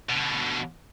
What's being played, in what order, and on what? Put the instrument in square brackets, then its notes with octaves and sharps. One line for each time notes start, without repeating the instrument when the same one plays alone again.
[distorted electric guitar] B2 D3